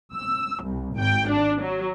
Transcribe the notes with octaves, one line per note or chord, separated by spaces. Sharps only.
E6
C2
G#1 G5
D4
F#3